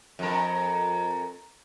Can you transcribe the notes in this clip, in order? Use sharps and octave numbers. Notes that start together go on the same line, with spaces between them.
F2 A#4